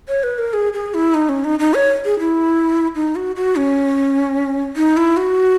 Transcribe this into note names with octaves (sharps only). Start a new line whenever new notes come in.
C#5
B4
A#4
G#4
G#4
E4
D#4
C#4
D#4
D#4
C#5
G#4
E4
D#4
F#4
F#4
C#4
D#4
E4
F#4